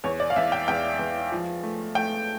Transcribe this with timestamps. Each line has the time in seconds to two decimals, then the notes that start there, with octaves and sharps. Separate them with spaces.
0.04 E2 C#5
0.20 D5
0.30 F5
0.36 E2 E5
0.52 G5
0.68 E2 G5
0.99 E2
1.32 F3
1.63 A3
1.95 A3 G5